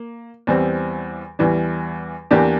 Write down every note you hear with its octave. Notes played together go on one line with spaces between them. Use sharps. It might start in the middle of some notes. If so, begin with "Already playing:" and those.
Already playing: A#3
E2 E3 G3 C4
E2 E3 G3
E2 E3 A#3 D4 G4